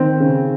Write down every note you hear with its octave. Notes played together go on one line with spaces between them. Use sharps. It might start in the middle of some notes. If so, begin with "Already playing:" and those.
Already playing: D#3 C4
C#3